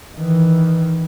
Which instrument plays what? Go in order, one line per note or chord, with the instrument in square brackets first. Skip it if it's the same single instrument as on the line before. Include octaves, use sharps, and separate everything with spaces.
[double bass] D#3 E3